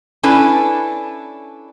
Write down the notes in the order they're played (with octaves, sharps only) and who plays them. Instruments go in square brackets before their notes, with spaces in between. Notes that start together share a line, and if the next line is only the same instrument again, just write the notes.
[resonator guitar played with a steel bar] C#4 D4 E4 A4 B4 D5